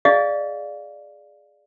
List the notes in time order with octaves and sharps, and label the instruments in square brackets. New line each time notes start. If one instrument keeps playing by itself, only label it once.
[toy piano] G#4 D5 D#5 F5